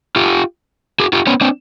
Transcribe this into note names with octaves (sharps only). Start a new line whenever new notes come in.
F4 G4
F#4 G#4
F4 G4
B3 C#4
C4 D4